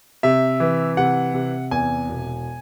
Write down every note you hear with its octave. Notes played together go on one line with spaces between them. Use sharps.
C3 E5
E3
C3 F#5
C3
E2 G#5
E1